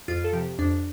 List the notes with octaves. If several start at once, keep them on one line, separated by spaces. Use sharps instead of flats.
F2 F4
A4
C3 F3 G4
F2 D4